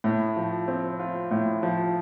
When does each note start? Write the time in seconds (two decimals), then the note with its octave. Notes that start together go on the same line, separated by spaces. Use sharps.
0.04 A2
0.36 F3
0.68 C4
0.99 F4
1.31 A2
1.63 F3